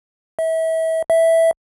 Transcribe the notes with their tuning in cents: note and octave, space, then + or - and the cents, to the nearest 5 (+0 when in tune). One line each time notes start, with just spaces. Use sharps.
E5 -30
E5 -5